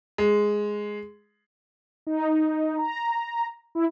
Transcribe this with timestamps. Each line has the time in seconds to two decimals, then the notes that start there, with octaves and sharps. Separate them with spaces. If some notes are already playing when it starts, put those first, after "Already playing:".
0.18 G#3
2.07 D#4
2.78 A#5
3.75 E4